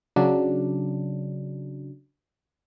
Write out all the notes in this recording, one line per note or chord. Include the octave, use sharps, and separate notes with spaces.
C#3 F#3 D4